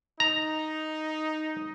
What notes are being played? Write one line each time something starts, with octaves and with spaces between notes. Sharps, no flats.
D#4 A#5